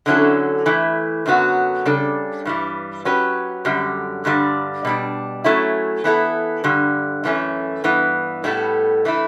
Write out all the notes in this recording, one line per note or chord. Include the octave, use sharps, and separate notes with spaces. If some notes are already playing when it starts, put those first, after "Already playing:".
D3 F#3 C#4 E4 A4
E3 A3 E4
F#2 D3 F#3 B3 F#4
C#3 G3 D4 A4
G2 E3 G3
F#3 C#4 G4 B4
F#2 D3 G3
G2 D3 G3 D4
B2 G3 D4
F#3 A3 C#4 E4
E3 B3 E4 A4
G2 D3 G3
F#2 E3 A3 C#4
G2 E3 B3
A2 G3 B3 E4 A4
E3 A3 E4